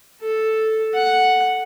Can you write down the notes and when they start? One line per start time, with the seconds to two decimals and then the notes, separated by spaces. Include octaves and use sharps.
0.21 A4
0.94 F#5